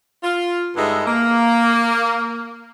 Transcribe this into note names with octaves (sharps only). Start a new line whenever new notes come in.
F4
G2 D3 G#3 D#4 E5
A#3